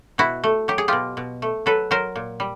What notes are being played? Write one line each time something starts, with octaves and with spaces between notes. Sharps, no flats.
B2 E4 F#4
A3
F#3 G4
G#4
B2 F4 G4
B2
A3
F#3 A4 B4
F#3 A#4 C5
A#2
G3